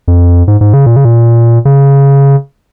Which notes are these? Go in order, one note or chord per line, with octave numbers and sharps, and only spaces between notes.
F2
G#2
G#2
C#3
A#2
C#3
A#2
C#3